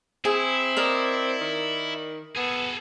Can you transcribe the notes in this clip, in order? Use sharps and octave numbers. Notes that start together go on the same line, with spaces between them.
C4 E4 G#4
A#4 D5 D#5
D#3
B3 G#4 A4